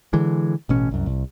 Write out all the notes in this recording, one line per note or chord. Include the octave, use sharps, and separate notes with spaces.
D3 E3 G#3
A1 B2 C#4
C2 F#2
C2